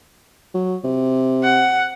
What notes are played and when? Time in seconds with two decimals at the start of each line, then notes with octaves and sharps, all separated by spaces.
0.54 F#3
0.84 C3
1.43 F#5